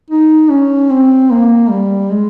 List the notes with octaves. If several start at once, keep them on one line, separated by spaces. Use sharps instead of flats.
D#4
C#4
C4
A#3
G3
G#3